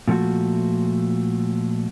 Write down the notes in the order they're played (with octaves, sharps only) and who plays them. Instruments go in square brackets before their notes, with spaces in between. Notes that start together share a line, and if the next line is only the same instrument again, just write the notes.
[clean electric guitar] A#2 F3 A3 F#4